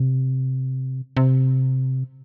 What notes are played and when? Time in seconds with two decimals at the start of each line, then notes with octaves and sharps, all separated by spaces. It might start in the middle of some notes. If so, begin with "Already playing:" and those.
Already playing: C3
1.17 C3